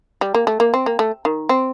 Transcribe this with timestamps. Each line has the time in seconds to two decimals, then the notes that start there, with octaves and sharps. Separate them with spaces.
0.21 G3
0.34 A#3
0.47 A3
0.60 A#3
0.74 C4
0.86 A#3
0.99 A3
1.25 D#3
1.49 C4